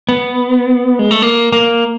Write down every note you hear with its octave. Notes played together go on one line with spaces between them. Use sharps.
B3
G#3
A3
A#3
A#3